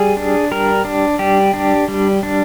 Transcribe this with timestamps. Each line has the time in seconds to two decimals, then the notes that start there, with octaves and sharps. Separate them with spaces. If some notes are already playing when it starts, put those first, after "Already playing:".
Already playing: G3 G#4
0.17 D4
0.51 G3 A#4
0.85 D4
1.19 G3 G4
1.54 D4
1.88 G3
2.23 D4